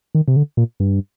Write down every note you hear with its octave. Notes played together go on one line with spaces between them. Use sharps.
D#3
C3
D3
A#2
G2